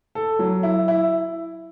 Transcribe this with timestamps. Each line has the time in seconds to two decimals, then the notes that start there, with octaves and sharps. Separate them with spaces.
0.15 A4
0.39 F#3
0.63 E4
0.88 E4